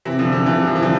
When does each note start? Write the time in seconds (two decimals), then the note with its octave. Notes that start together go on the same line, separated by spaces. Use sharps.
0.05 C3 E3
0.19 D3 F3
0.32 D3 F3
0.46 C3 E3
0.61 G3
0.67 F3
0.76 E3
0.82 D3 F3